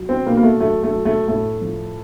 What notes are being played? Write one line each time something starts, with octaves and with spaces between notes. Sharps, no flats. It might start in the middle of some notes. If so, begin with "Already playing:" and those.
Already playing: F#3
C4
B2 A#3
A#3
A3
F#3 A3
A3
F#3
A3
A2 A3
F3